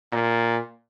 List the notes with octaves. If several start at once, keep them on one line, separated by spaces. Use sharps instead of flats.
A#2